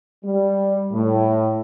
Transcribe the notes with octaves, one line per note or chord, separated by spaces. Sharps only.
G3
A2